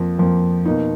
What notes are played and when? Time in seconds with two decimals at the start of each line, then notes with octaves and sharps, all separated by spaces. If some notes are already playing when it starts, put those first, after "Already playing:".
Already playing: F2 F3 A#3
0.18 F2 F3 A#3
0.66 B2 A#3 D#4